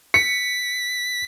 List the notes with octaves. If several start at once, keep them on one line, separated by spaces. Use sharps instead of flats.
B6 C#7